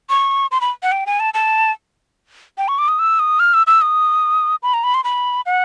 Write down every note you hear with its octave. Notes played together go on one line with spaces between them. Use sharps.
C#6
C6
B5
F#5
G5
G#5
A5
A5
G5
C#6
D6
D#6
E6
D#6
F6
E6
E6
D#6
B5
A#5
B5
C6
B5
F#5